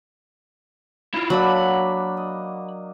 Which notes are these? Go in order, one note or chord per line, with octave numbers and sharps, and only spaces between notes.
E4 F4
F#3 A#3 D4 F#4 E5 B5
D#5